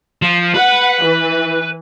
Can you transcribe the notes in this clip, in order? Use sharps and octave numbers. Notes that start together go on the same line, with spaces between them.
F3
B4 F#5
E3